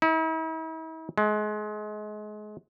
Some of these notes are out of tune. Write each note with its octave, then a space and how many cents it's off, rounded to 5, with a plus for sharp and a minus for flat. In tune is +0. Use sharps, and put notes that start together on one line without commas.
E4 -45
G#3 +30